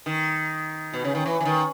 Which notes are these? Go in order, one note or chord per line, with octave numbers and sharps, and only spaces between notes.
D#3
B2
C#3
D#3
E3
E3
D#3